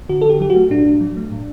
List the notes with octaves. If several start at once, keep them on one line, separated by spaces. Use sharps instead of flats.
D3 F#4
A4
D3 G4
F#3 G4
F#4
A3
A2 D4
A2
F#3
A3
A2